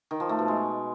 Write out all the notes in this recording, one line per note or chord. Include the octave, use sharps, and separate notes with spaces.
D#3
F3
A3
B2
G#3